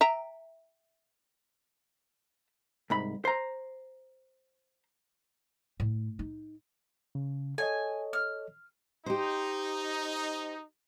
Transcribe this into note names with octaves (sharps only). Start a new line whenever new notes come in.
E5 G5 A#5
C2 G#2 B5
C5 A#5
A2
D#4
C#3
A4 C#5 D#5 G#5
F6
D#4 G4 C5